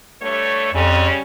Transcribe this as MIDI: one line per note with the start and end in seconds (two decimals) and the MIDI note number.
0.22 0.70 43
0.22 0.70 57
0.22 0.70 73
0.74 1.08 41
0.74 1.21 49
0.74 1.21 55
0.74 1.21 61